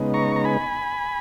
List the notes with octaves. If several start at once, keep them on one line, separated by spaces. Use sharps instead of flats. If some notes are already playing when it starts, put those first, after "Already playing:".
Already playing: C#3 G#3 B3 D#4
A#5 C#6
A#5
G#5 B5